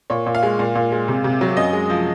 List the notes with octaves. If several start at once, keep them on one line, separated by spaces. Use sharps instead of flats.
A#2 C#5
A#2
F5
G#3
A#2
A#2
G#3
C3
C3
F#3
F#2 D#5
G#3
F3